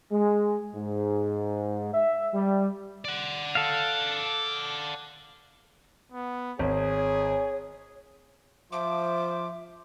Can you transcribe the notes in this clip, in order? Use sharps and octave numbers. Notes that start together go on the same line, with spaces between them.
G#3
G#2
E5
G3
D5 F#5
A4 F5
B3
G#1 G#4 C#5
F3 C5 E5 D6